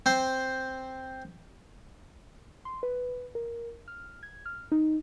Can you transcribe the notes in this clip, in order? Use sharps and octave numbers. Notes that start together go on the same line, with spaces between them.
C4 C5
C6
B4
A#4
F6
G#6
F6
D#4